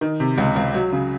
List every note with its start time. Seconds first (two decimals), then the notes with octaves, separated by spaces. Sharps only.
0.01 D#3
0.20 C3
0.38 C#2
0.56 C#2
0.74 F#3
0.92 C#3